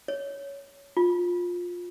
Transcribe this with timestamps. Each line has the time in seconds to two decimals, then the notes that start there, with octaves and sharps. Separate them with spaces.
0.08 C#5
0.97 F4